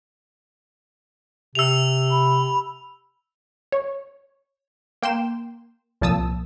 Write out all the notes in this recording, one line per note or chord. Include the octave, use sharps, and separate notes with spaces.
C3 E6 F7
B5
C#5
A#3 G5 C6 E7
C2 A#2 F3 A5 D#6 E6